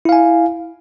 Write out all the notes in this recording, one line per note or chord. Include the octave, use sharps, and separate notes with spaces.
E4 F5 G#5